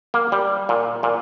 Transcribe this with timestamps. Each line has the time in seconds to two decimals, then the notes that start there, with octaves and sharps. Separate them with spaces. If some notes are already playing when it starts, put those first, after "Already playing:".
0.14 A#3
0.32 G3
0.69 A#2
1.03 A#2